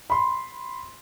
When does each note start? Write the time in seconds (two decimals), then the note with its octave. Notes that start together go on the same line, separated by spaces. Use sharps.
0.10 B5 C6